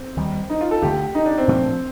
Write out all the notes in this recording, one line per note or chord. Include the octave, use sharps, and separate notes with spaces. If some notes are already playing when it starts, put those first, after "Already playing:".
Already playing: C4
D#2 D#3 G3
D#4
F4
A4
D2 D3 A3 G4
D#4
D4
C4
A#2 F3 A3 D4